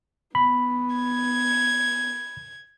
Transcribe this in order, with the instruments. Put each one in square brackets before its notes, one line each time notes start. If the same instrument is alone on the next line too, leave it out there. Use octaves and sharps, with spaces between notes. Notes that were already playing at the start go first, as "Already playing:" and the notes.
[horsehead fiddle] B3 [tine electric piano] B5
[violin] G#6